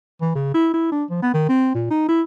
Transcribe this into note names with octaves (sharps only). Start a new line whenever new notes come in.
E3
C#3
E4
E4
D4
F3
B3
D#3
C4
A#2
D#4
E4